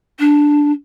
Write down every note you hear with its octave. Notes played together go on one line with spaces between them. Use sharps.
D4